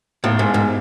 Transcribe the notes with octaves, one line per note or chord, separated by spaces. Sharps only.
A2 B3 D#4 G4 C5 F5
G#2
G#2